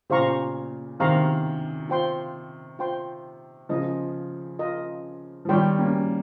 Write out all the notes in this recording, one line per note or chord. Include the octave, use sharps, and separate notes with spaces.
A#2 C#3 G4 C5 F5 A#5 C#6
C3 D#3 G4 C5 F5 A#5 C#6
F4 C5 G5 C6
F4 C5 G5 C6
C#3 F3 F4 A#4 D#5
F4 A#4 D#5
F3
D#3 G3 G4 C#5 G5 C6
A#3 C#4